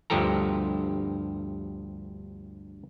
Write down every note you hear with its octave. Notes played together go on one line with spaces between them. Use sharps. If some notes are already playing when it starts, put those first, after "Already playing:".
D2 G2 F3 G4 A4 A#5